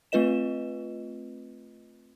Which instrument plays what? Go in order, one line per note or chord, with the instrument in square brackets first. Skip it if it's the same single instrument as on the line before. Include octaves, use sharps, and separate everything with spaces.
[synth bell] A3 C4 F4 B4 D#5 E7